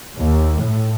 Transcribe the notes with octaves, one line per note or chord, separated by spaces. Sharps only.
D#2
A2